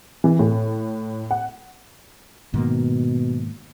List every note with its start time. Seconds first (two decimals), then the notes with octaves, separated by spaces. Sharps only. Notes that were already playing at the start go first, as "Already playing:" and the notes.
0.24 E3
0.39 A2
1.31 F#5
2.54 G#2 B2 D#3 A#3